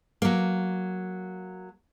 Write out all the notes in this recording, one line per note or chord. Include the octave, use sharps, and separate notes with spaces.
F#3 A#3